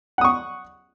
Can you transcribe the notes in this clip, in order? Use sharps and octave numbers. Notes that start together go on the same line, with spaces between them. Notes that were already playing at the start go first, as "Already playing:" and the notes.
F#5 C#6 D#6